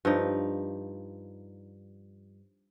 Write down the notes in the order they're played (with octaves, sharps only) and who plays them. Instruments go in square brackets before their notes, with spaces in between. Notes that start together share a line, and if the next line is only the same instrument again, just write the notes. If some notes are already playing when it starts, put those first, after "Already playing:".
[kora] G2 F3 D#4